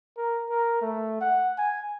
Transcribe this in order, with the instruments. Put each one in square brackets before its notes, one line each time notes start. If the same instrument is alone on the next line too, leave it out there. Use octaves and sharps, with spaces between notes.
[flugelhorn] A#4
A#4
A3
F#5
G#5